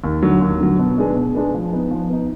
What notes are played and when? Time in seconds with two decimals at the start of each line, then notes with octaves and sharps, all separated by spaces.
0.04 D#2
0.22 D3 F#3
0.41 D#2
0.60 D3 F#3
0.79 B2
0.98 G#3 D4 G#4 B4
1.16 B2
1.35 G#3 D4 G#4 B4
1.54 F3
1.72 B3 D#4
1.91 F3
2.10 B3 D#4